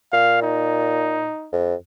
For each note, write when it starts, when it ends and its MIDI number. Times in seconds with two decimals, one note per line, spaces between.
0.13 1.30 46
0.13 0.39 77
0.43 1.50 63
1.53 1.74 41